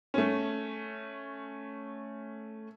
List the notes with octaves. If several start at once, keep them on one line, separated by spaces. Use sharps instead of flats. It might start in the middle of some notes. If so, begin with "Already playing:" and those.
A3 C#4